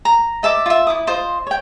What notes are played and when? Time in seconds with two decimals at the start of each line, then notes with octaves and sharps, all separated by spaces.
0.05 A#5
0.43 D#5 E5 A5 D6
0.66 F4 E5
0.87 E4 D6 D#6
1.07 F4 C5 D#5
1.47 C#5 G5